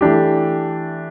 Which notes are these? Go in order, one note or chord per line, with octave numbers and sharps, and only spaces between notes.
E3 A3 D4 G4